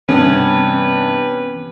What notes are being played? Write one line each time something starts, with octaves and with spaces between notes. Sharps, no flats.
G2 C3 E3 B3 C#4 B4